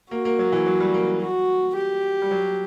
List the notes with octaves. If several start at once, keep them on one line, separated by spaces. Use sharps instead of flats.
A#3 F#4
A#3
F#3
E3
F#3
G3
A#3
F#4
G4
G3
F#3